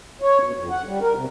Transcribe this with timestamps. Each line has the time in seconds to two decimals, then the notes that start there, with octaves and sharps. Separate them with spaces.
0.22 C#5
0.43 B2
0.56 F2
0.71 F#5
0.86 G3
1.01 A#4
1.15 C3